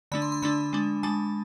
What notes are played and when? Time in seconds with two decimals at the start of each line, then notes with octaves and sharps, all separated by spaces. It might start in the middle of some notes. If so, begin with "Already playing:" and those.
0.12 D3 A3 D4 B5
0.22 C6
0.32 C6
0.42 D3 A3 D4 B5
0.73 G#3 D4
1.03 G#3 D4 A5